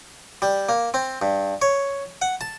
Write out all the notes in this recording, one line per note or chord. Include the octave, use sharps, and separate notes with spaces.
G3
A#3
C4
G2
C#5
F#5
A5